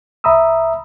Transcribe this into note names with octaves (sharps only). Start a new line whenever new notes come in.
C2 E5 A#5 B5 D#6 E6